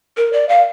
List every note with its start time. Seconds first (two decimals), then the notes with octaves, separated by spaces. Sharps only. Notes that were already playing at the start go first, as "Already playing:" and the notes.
0.17 A#4
0.33 D5
0.49 F5